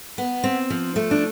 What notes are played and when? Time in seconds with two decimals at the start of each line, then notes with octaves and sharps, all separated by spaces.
0.18 B3
0.44 C4
0.70 F3
0.96 A3
1.11 D4